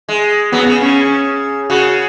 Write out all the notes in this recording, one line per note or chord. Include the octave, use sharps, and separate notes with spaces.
G#3
F#3 B3
C#3
C#3 C#4
C#3 F#4